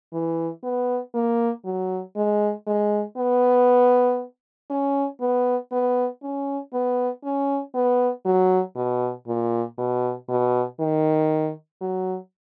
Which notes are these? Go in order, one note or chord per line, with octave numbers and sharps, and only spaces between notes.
E3
B3
A#3
F#3
G#3
G#3
B3
C#4
B3
B3
C#4
B3
C#4
B3
F#3
B2
A#2
B2
B2
D#3
F#3